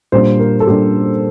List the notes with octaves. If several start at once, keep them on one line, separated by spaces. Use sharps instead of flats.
A#2 G3 D4 C5
A#4
A4
A#2 G3 D4 G4